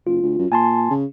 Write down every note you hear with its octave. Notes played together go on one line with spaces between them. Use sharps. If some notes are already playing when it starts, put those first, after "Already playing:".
F#1 F4
D2
F#2
A#2 G#5 A5 C6
C#3